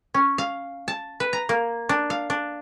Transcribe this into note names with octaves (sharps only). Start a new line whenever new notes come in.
C#4
F5
A5
B4
A#5
A#3
D4
F5
D4